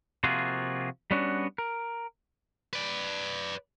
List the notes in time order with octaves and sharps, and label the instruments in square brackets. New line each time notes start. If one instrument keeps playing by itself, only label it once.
[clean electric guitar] C3 F3 A#3 F4 F#4 G#4
G3 B3 C#4 D4 F#4
A#4
[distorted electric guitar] B4 D5